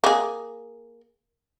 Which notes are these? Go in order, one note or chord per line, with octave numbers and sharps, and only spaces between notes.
A#3 G#4